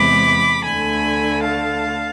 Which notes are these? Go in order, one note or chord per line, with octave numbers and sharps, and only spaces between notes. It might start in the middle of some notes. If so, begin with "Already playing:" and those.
Already playing: E2 C3 G#3 B3 B5 D6
D2 D3 A3 G#5 B5
F5 A5